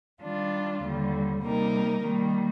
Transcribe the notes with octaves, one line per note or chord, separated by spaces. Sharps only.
D#3 G3 D4 F4
D#2 D3 G3
C3 G3 A#3 D#4 A#4
D#3 G3 A#3